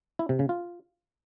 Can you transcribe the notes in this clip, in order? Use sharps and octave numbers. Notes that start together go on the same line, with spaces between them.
E4
C3
C#3
F4